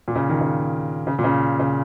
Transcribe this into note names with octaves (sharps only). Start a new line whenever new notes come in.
A#2
C#3
D#3
C#3
C#3
A#2
C#3
C#3